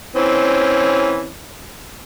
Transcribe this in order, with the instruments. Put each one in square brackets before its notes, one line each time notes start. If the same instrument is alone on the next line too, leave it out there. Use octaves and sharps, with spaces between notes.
[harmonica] E3 C4 C#4